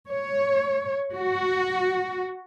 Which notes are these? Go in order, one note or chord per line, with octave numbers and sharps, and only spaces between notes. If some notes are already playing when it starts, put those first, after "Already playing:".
C#5
F#4